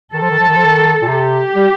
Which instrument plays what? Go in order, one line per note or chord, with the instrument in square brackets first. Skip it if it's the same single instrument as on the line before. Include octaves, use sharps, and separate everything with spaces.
[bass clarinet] D#3 [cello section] A4
[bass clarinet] F3
D#3
F3
D#3
F3
D#3
A#2
[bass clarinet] C3 [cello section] G4
[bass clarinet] G3